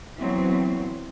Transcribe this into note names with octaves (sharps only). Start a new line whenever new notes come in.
E3 F#3 B3 C4